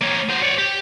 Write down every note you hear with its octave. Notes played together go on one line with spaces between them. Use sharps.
A#3 C#5
F#3 C5
C#5 D5
G4